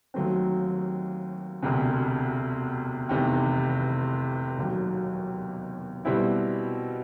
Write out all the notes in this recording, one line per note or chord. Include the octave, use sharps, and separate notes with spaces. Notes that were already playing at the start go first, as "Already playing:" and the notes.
D#2 D#3 F#3 A3 C4
E1 D2 C3
F1 E2 C3 D#3
E1 D#2 D#3 F#3
B2 G3 C4 E4